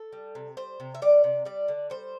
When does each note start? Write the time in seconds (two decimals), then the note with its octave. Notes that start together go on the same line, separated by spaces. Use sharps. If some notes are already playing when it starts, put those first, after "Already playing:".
Already playing: A4
0.13 G3
0.35 C3
0.57 G3 C5
0.80 C3
0.95 E5
1.02 G3 D5
1.24 C3
1.45 G3 D5
1.68 D3
1.90 G3 C5